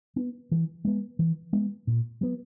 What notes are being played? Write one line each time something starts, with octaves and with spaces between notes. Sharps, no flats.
B3
E3
G#3 B3
E3
G#3 B3
A#2
F#3 B3